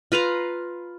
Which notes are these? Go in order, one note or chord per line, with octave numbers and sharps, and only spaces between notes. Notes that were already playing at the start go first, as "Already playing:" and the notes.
F4 B4 F5 A#5